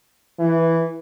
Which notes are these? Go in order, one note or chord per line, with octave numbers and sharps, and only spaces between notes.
E3